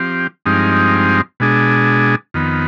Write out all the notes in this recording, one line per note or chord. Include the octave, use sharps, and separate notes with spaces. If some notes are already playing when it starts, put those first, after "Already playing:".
Already playing: F3 C4 G4
G2 F3 G#3 C4 D#4
B2 G#3 D4 G#4
F2 D#3 B3